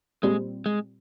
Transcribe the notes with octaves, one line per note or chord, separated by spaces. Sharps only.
A#2 G3 G#3 C4
G#3